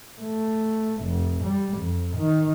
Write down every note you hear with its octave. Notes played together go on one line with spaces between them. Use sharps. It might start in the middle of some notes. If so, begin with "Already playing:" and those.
A3
F1
G3
F2
D#3